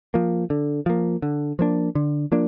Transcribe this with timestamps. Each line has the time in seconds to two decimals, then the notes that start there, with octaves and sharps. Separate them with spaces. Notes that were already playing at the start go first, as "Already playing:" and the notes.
0.14 F3 A#3
0.50 D3
0.86 F3 A#3
1.22 D3
1.59 F3 A#3 D4
1.95 D3
2.32 F3 A#3 D4